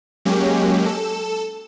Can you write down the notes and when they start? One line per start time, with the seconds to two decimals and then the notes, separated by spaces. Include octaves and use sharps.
0.25 F#3 G#3 A#3 C#4 G4
0.86 A4 E7